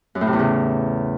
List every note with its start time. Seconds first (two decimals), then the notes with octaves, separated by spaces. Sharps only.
0.15 F#2
0.21 A2
0.27 C3
0.33 E2
0.39 C#3